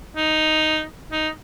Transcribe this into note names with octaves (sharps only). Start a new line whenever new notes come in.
D#4
D#4